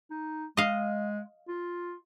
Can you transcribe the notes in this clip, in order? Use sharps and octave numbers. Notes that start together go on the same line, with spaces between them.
D#4
G#3 D#5 F5
F4